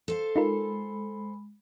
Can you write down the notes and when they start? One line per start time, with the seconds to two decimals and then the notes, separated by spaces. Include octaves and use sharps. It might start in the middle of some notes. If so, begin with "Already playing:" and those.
0.08 A4 C5 F5
0.36 G#3 D#4 F4 A#4 B5